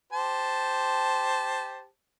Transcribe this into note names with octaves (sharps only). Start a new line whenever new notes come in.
G4 C5 A5